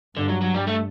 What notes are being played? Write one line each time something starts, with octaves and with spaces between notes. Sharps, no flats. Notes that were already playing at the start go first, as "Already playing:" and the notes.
G2 D3
F#3
F#3
G3
A3